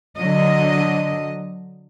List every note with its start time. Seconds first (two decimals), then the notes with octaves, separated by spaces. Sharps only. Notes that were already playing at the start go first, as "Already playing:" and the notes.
0.16 D3 F#3 D#5